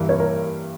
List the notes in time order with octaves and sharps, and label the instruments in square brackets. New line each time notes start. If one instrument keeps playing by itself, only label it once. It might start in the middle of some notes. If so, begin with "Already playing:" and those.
Already playing: [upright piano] G2 E3 A#3 E4
[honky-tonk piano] C#5
A#4